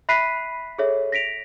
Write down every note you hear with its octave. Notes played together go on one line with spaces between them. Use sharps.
E5 B5 F#6 B6 C7 D#7
G#4 A4 C#5 E5
A#6 B6 D7 F7